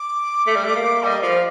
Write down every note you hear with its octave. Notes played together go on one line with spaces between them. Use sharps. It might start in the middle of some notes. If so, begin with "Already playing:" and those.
Already playing: D6
A3
G3
A3
A#3
G3 D#5
F3 F5